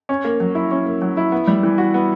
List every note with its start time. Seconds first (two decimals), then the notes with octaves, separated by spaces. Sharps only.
0.09 C#4
0.24 A#3
0.40 F#3
0.55 E4
0.71 C#4
0.86 A#3
1.02 F#3
1.17 E4
1.32 B3
1.47 G3
1.63 E3
1.78 F#4
1.94 B3